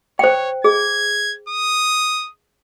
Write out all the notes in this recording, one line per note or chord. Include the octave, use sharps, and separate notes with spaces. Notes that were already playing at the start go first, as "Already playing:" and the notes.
C5 C#5 G5
G#4 G#6
D#6